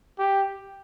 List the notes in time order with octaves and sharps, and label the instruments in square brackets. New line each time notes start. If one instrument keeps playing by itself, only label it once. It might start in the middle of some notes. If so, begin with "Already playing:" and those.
[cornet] G4